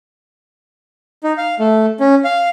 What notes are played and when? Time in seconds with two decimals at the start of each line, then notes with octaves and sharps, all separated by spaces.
1.24 D#4
1.38 F5
1.59 A3
2.00 C#4
2.24 F5